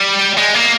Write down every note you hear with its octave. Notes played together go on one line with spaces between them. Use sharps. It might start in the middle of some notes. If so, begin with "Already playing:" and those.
Already playing: G3
G#3
A#3